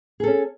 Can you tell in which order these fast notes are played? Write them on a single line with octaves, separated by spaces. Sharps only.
G#4 A4 C#4